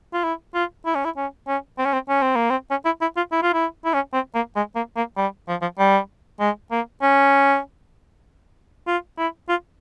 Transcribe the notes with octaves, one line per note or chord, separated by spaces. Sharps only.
F4
E4
F4
E4
C#4
E4
C#4
C#4
C4
C#4
C4
C#4
C4
A#3
C4
C#4
E4
E4
F4
E4
F4
E4
E4
C#4
C4
A#3
G#3
A#3
A#3
G3
F3
F3
G3
G#3
A#3
C#4
F4
E4
F4